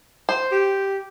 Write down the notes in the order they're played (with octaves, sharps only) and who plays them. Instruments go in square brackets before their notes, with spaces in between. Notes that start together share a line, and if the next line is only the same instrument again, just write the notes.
[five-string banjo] C5
[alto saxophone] G4